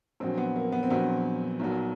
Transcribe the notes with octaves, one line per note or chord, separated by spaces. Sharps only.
A#1 A#2 F#3 C4
B3
A#3
B3
C4
A#1 A#2 F#3 B3
B1 A#2 F#3